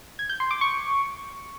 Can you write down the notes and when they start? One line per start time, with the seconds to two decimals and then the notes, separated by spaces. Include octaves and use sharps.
0.19 G#6
0.30 G6
0.40 C6
0.51 D6
0.61 C#6